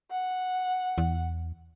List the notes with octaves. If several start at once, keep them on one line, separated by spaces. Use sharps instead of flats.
F#5
E2